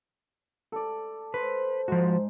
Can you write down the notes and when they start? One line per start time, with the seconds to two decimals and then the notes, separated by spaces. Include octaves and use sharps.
0.72 A4 D5
1.34 B4 C5
1.88 G#2 F3 F#4